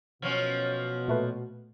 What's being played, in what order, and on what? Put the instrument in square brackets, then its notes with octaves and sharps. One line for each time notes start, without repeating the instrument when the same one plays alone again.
[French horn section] B2 [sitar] F3 F#3 C#4
[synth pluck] A#2 A3 B4